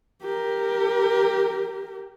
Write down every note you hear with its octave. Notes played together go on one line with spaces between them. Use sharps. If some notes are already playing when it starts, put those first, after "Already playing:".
G4 A#4